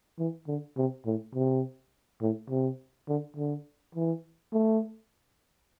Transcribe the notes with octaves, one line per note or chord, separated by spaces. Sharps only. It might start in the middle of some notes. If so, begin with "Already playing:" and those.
E3
D3
C3
A2
C3
A2
C3
D3
D3
E3
A3